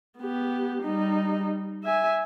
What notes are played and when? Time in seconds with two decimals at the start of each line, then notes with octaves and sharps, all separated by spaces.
0.19 B3 G4
0.82 G3 D#4
1.84 E5 G#5